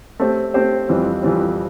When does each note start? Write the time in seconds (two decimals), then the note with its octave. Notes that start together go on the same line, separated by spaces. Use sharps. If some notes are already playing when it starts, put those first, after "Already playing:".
0.20 A3 C4 G4 C5
0.54 A3 C4 G4 C5
0.89 F2 E3 G3 C4
1.23 F2 E3 G3 C4